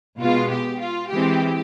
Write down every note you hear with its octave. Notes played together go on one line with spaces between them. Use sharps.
B2 G#3 B3 F4
G4
F4
E3 G#3 C4 G4